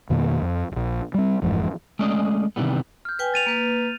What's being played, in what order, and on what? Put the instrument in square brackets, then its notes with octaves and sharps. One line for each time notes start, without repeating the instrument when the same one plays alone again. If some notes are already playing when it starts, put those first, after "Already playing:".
[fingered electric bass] F2 B2 D#3 A#3
F2
D1 A#1
G3 C4
G1 F2 G#2 E3
[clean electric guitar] G#3 A3 C#4 D5 D#5
C3 D#3 E3 G3 B3
[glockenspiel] F6 G6
[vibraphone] B4 G5 G#5
[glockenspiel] A6 D#7 F7
[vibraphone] A#3 B4